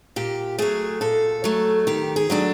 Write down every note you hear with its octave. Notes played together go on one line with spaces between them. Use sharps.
A#2 G4
F#3 A3 G#4
A#2 A4
F#3 A3
D#3 G4
G#4
F#3 A3 D4